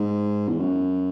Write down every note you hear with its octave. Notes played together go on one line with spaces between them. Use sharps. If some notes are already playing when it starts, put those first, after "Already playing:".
Already playing: G#2
E2
F#2